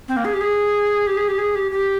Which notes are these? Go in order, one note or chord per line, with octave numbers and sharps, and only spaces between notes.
C4
A#3
G#4
G4
G#4
G4
G#4
G4
G#4
G4
G4